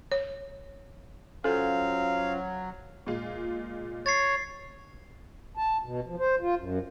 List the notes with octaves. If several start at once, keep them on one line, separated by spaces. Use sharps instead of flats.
C#5
F#3 C#4 F4 A4 C5 F5
A#2 G#3 F4
C#5 A6 C7
A5
B2
F3
C5
F4
F#2